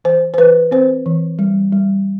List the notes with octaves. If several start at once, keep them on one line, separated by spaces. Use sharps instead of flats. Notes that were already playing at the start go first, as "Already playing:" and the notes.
E3 C5
C5
E3 B4
C4 C5
E3
G3
G3